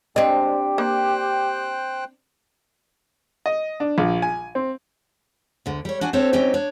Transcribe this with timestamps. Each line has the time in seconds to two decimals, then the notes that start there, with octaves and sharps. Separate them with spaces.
0.16 G#3 C4 D4 G4 D#5
0.78 A#3 C5 G5 F#6
3.46 D#5
3.80 D4
3.98 A#1
4.22 G#5
4.55 C4
5.66 D2 D3
5.85 G3 C#5
6.01 D4 F#4 F#5 G#5
6.13 C4 D4 G4 A4 C5 C#5
6.33 F#3 C4 C#4 D#4 G4 C5
6.54 D4 C#5